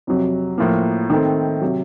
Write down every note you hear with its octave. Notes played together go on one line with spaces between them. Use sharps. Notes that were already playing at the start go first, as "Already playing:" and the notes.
F2 C3 F#3
A2 F3 A#3
D#3 A3 C4
C3 F#3